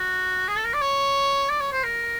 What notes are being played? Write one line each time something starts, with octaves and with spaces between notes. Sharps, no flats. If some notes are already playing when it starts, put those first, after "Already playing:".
Already playing: F#4
G#4
A4
A#4
D5
C#5
D5
C#5
C5
A#4